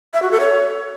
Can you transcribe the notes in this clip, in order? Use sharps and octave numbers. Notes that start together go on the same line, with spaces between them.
E5
F#4
A4
C#5